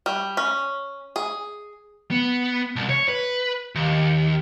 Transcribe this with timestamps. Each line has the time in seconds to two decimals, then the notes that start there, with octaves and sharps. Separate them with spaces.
0.06 G3
0.37 C#4
1.16 G#4
2.11 B3
2.76 C2
2.89 C#5
3.08 B4
3.75 D#2